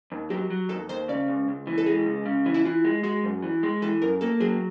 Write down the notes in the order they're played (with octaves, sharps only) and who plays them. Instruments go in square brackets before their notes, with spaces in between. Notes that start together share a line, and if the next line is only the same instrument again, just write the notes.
[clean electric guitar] D#2
[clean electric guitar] F#3 [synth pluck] G4
[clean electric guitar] F#3
[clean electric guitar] D#2 [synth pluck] A4
[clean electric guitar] D#2 [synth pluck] C5
[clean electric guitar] C#3 [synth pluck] D5
[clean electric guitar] C#2
C#2
E3
[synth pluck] A4
[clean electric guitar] G#3 [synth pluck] G#4
[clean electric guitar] C#2
C#3
E3
[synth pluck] E4
[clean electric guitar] E3 [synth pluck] F4
[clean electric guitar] G#3
[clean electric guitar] G#3 [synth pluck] F#4
[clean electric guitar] F#2
E3
G#3
[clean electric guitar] E3 [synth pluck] A4
[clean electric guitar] F#2 [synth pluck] A#4
[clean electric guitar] A#3 [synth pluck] A4
[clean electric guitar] F#3 [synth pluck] G#4